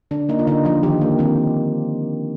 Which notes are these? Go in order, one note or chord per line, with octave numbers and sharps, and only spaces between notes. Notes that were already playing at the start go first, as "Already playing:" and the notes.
D3 D4
A#3 D#4
F4
D3 D#4
F3 F4
D#3 G4
A#3
D#3 C4